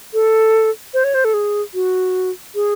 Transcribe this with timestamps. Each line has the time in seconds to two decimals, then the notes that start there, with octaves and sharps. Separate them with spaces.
0.14 A4
0.94 C5
1.04 C#5
1.14 C5
1.25 A4
1.34 G#4
1.74 F#4
2.55 G#4